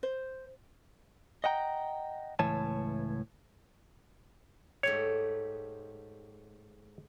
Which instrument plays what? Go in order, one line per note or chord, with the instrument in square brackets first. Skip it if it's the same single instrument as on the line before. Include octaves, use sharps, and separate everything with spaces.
[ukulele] C5
[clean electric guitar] D#5 F#5 G5 A#5
C#2 A2 E3 C#5 G#5 A5
[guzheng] G#2 A3 G4 [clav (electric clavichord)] C#5